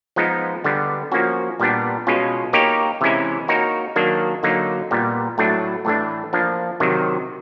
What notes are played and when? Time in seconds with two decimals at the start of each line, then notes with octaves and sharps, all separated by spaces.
0.16 F3 G#3 B3 D#4
0.64 D3 G3 B3
1.12 F3 A#3 C#4 F#4
1.60 A#2 G3 B3 D4
2.07 B2 G#3 C#4 F4
2.53 A#3 D#4 G4 A#4 C#5
3.01 C3 E3 G#3 C#4 E4
3.48 A#3 D#4 F#4 A#4 C#5
3.96 D#3 F#3 A#3 D4
4.43 D3 F#3 A#3 D#4
4.91 A#2 G3 B3
5.38 A2 F#3 A3 D4
5.85 A2 E3 A3 D4
6.33 F3 A#3 D4
6.80 C3 D#3 F#3